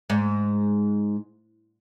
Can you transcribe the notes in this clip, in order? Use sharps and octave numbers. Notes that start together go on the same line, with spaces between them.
G#2